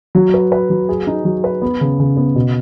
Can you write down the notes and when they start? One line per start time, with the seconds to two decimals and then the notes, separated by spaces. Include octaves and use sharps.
0.15 F#3
0.34 B4
0.52 B4
0.70 F#3
0.89 G#4
1.07 D#4
1.25 F#3
1.44 B4
1.62 B3
1.81 C#3
2.00 C#3
2.17 B3
2.36 B2